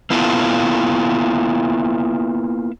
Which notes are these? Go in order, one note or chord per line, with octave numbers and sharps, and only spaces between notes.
A#3 B3 E4 F4 A4